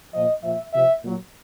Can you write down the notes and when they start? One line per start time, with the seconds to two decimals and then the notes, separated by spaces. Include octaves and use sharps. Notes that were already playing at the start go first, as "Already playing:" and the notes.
0.13 A#2 F3 D#5
0.43 A#2 F3 E5
0.73 C3 F3 E5
1.03 A#2 F#3